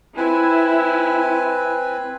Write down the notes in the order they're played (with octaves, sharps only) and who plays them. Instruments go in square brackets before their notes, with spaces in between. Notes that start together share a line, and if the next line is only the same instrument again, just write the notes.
[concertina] C4 B4 G#5 [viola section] E4